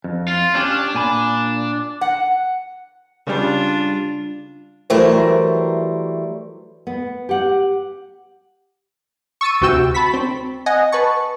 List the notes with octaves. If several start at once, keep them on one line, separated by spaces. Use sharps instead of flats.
F2
F4
C#4 D4 G4
A#2 G#5 B5
F#5
C#3 G3 D4 F4
E3 F#3 G3 A3 A#4 C5
B3
G4 F#5
C#6 E6 A6 C#7 D#7
D2 C3 F#4 G5 E6 E7
A5 B5 C#6 B6
C4
D#5 F#5 G#5
B4 A5 C#6